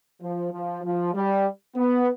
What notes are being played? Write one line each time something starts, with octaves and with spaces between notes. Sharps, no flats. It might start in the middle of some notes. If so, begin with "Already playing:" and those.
F3
F3
F3
G3
B3